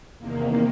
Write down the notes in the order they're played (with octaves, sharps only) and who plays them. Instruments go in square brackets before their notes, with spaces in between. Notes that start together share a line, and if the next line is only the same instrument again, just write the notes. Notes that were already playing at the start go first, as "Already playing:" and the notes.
[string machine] E2 C3 D#3 A#3